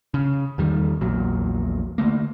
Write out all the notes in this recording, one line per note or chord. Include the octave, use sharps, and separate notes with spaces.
C#3
E2 D#3 G3
A#1 E2 A#2 F#3
D3 E3 A3 A#3